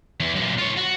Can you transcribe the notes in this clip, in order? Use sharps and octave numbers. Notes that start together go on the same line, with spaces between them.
E2
F#2 A#2
F4 C#5
F#4